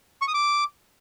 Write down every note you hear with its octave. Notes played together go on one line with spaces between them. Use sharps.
C#6
D#6
D6